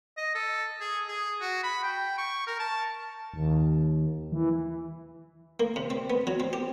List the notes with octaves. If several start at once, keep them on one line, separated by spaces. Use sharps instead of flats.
D#5
A4
G#4
G#4
F#4
B5
G5
C#6
A#4
A5
D#2
E3
A#3
C3
C4
B3
F#3
C4
G4